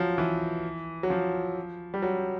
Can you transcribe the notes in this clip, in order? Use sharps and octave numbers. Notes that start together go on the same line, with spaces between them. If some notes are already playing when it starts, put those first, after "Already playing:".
Already playing: F3 F#3
E3
F#3
F3
G3
F#3